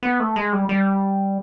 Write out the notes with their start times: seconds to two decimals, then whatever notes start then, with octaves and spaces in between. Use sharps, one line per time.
0.03 B3
0.20 A3
0.36 G#3
0.53 G3
0.69 G3